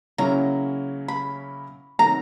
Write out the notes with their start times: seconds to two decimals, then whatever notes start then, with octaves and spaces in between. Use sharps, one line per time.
0.18 C#3 F#3 A#3 C#4 E4 A#5
1.08 B5
1.99 C3 D#3 F#3 A3 A#5